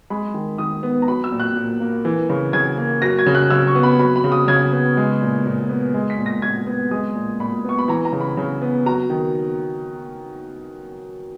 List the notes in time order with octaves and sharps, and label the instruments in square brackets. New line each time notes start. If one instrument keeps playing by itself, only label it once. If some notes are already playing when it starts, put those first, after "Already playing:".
[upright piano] G#3 B5
D#3
D#3 D#6
B3
A#5
F#3 B5
E6
A#2
F#6
A#2
A#3
E3
C#3
C#3 G#6
A#3
F#3 A#6
G#6
C#3
F#6
C#3 E6
C#6
B3
B5
F#3 B5
B5
C#3
D#6
C#3 G#6
B3
G#3
A#2
A#2
B3
G#3
B6
A#2
A#6
A#2 G#6
B3
G#3 D#6
A#2
A#2 B5
B3 C#6
B5
E3 A#5
A#5
C#3
B5
C#3
B3
F#3 A#5
D#3